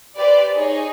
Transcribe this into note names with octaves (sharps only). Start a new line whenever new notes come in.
G4 B4 C5 D5
D#4 G#4 C#5 D#5